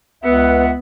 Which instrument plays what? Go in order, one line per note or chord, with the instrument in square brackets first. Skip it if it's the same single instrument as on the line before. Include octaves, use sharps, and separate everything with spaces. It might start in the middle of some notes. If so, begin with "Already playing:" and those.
[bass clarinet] C#2 [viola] B3 [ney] B4 [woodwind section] E5 F#5